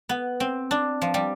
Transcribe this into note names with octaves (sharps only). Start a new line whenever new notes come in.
B3
C4
D4
F3
G3